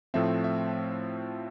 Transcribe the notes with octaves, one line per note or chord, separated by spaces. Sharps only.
A2 F3 A3 C4 E5
E5